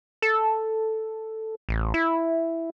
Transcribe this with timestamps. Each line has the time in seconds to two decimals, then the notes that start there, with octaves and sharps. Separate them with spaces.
0.22 A4
1.69 A1
1.94 E4